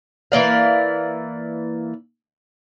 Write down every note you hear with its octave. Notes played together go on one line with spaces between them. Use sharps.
E3 A#3 D5 F5